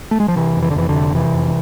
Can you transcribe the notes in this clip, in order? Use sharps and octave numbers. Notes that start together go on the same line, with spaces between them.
A3
G#3
F3
C3 E3
F2
E3
D3
F2 E3
D3
C3
C3 E3
F2